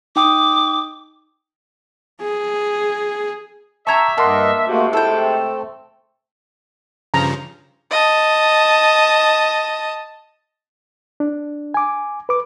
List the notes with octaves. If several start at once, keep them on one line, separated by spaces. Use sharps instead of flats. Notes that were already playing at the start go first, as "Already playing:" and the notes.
D#4 G5 D6 D#6
G#4
G4 E5 A5 A#5 C#6 G#6
G2 A#3 D#5 F#5 A5 C6
G#2 C3 A3 A#3 F#4
E4 A4 G5
A3 C4
G2 C#3 F3 A#5
D#5 A5
D4
G#5 D6
B4 D6